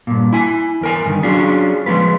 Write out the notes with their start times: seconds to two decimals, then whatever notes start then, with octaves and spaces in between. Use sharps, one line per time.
0.07 G2 A#2
0.33 E4 G#5
0.81 E2 A#4 G#5
1.05 G2 D#3
1.23 F#3 C#4 D4 F4 G#4
1.86 F3 F#3 G#3 F4 B4